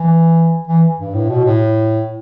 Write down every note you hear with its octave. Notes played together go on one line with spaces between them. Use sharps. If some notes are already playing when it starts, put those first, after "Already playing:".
Already playing: E3
E3
G2
A2
B2
A2